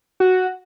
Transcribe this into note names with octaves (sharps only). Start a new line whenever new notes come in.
F#4